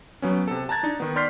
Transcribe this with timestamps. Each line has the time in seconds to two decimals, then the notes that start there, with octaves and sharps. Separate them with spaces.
0.22 F#3 B3 C#4
0.48 C3 A4
0.69 A5 A#5 F#6 G#6 A6
0.83 D4 D#4
1.00 D#3 B3
1.16 D5 C6 F6 G6 B6 C7